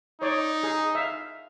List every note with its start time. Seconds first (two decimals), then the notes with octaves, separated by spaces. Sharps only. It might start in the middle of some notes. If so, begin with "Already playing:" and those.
0.22 D#4 C#5 D5
0.63 G#4
0.95 E5 F5